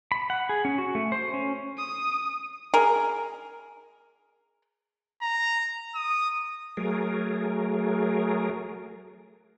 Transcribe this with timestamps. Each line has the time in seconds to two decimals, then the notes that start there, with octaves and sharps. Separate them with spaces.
0.12 B5
0.30 F#5
0.49 G#4
0.65 C#4
0.78 F#4
0.95 A3
1.12 C5
1.34 C#4
1.78 D#6
2.74 G#4 A#4
5.22 A#5
5.95 D#6
6.77 F#3 A3 G#4 A#4